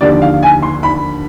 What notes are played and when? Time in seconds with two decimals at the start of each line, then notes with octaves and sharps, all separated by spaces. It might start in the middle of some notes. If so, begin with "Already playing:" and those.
0.01 D#2 D3 F3 D5
0.22 F5
0.43 G#5
0.62 C6
0.83 B5